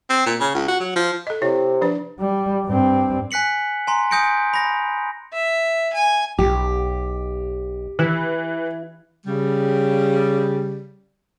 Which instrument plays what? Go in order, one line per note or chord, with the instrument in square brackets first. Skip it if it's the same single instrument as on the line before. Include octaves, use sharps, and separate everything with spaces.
[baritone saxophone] C4
A#2
C#3
C#2
F#4
F#3
F3
[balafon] A4 D#5
[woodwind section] C3 [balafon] E4 C#5
[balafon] F3 D4 B4
[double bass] G3
G2 C4
[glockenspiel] G#5 F#6 B6 C#7 F#7
G#5 A#5 C6
G#5 D#6 G6 A#6 C#7 D7
B5 A#6
[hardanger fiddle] E5
G#5
[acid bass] B1 [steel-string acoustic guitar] G4
[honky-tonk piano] E3 [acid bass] E4
[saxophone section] C#3 G3